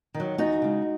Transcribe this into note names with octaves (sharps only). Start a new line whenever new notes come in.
D#3
F#3
E2 D#4 F#4
C#3 G#3